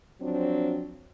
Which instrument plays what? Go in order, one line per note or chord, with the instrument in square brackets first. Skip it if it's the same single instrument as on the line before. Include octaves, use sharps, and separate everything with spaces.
[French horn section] F3 F#3 C4 D4